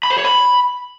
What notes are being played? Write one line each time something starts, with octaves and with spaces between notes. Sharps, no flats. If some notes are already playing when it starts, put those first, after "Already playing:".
B5
C5
C#5
B5